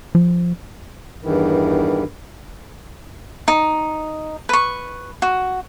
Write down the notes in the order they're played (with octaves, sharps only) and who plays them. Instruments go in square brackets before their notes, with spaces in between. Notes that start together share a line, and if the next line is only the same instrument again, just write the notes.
[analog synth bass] F3
[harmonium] E2 G2 D#3 E3
[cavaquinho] D#4
B4 C#6
F#4